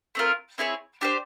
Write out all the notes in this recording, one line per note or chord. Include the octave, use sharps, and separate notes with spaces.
A3 C4 F4 A#4
C4 E4 G#4 C#5
D4 G4 C5